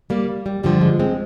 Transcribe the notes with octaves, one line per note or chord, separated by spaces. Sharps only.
G3 A#3
G3
G2 D3 F3 G3
G#3
G#3 C4